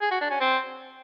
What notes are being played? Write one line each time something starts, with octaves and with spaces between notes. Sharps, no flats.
G#4
F#4
D4
C#4
C4